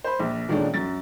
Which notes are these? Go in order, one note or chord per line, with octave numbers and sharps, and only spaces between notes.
C5 B5
A#1
A#2 D#3 G#3 A3 C#4 D4
F#2 A6